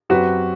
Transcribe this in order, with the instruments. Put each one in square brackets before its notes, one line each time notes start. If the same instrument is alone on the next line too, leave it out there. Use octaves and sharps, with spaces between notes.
[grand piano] F#2 F#3 C4 G4 B4 [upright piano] F#4